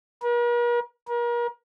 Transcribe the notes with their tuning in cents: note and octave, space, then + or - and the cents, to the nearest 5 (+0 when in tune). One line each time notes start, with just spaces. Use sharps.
A#4 +45
A#4 +35